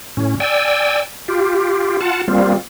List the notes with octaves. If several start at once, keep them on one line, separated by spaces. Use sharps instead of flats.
A2 C#4
D5 G5 G#5 E6
F4 G4
F4 F#5 A5
G3 A#3 C4 F4